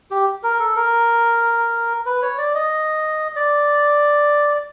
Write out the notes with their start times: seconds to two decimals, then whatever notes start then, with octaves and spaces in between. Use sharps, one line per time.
0.11 G4
0.43 A#4
0.59 A4
0.76 A#4
2.06 B4
2.22 C#5
2.38 D5
2.55 D#5
3.36 D5